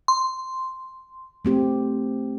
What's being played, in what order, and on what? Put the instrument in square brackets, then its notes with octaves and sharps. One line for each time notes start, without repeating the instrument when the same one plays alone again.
[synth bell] C6
[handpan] A3 C4 G4